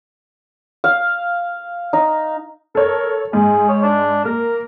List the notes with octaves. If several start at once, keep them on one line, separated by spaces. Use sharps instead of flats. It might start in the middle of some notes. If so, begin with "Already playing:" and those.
F5
D#4
A4 A#4 C#5
G#2 G#4
C#5
D4
A#3 A#4